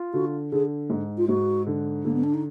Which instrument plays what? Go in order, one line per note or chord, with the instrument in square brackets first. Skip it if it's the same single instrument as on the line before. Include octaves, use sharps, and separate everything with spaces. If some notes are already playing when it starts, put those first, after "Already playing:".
Already playing: [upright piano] F4
[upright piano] D3 [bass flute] F#4
[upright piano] D3 [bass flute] G#4
[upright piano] G#2
[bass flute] F4
[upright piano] G#2 [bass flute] F#4
[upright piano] D3
[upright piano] D3 [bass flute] A#3
[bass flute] B3
D4
D#4